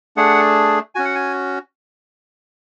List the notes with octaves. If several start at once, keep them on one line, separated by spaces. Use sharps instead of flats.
A3 D4 G#4 F#5
C#4 F#4 G#5
F#5
G#5